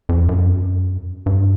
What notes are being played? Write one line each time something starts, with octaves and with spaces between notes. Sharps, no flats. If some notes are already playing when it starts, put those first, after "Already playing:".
F2
F#2
G2